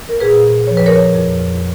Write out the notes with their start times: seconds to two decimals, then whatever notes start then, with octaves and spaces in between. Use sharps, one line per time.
0.09 A#4
0.20 A#2 G#4 B4
0.67 F3 C#5
0.77 B4
0.86 A#4 C#5
1.15 F2